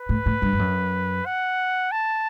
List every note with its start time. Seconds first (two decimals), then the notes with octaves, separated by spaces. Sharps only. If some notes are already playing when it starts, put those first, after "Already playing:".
Already playing: B4
0.09 A2
0.26 A2
0.42 G2
0.53 G2
0.59 F#2
1.26 F#5
1.92 A5